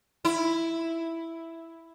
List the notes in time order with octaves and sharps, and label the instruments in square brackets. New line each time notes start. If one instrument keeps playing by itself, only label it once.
[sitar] E4